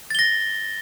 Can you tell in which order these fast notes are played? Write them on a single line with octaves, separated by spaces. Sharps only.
A6 G7 A#6